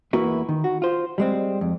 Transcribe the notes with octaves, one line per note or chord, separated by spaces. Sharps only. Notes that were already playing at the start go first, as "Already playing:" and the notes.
E2 A#3 E4 F#4 A#4 B4
D#3
F#4
F4 C5
G3 G#3 C4
F2